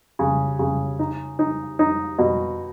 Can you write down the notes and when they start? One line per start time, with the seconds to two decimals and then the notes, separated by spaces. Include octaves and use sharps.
0.19 C#3
0.59 C#3
0.99 D#4
1.39 D#4
1.79 D#4
2.18 B2